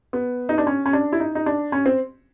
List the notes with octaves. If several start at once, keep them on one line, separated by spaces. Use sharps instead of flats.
B3
D#4
D4
C#4
C#4
D4
E4
D#4
D#4
D4
C#4
C4